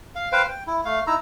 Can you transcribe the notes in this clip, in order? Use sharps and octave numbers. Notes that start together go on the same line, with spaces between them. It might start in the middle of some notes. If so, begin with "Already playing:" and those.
F5
B4 C5 F5 G5
G5
E4
A3 F5
D#4 E4 A#5 E6